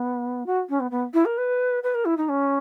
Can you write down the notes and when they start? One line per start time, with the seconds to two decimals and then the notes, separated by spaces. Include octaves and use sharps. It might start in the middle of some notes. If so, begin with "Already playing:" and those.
Already playing: B3
0.46 F#4
0.69 C#4
0.80 B3
0.91 B3
1.14 E4
1.25 A#4
1.38 B4
1.83 B4
1.95 A#4
2.05 E4
2.17 D#4
2.29 C#4